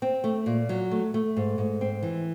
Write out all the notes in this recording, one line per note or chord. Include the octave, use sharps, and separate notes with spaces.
C4
A3
A#2
F#3
A3
A3
G#2
G#2
C4
E3